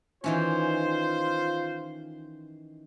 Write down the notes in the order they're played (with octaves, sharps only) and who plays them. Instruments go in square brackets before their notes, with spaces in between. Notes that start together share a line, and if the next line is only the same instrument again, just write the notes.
[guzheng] D#3 E3 C#4 [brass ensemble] F4 C5